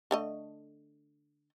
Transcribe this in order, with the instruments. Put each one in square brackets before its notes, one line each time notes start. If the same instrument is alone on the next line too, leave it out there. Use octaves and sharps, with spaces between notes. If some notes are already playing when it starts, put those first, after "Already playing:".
[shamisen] D3 A3 D#5